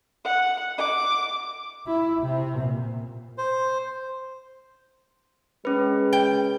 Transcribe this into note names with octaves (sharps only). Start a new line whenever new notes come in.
F#5
D6
E4
C3
A#2
C5
G#3 C#4 B4
G5